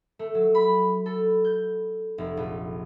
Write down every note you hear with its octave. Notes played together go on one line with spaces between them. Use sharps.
A3
F#3
B5
A4
G6
F1
A#1